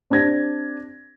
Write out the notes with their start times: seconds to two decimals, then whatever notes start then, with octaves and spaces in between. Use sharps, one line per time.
0.10 C4 D4 G4 G#6 A#6